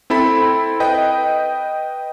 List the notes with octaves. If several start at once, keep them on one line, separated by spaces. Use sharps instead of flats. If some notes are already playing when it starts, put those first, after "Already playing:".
C4 E4 A4 B5
B4 D#5 G5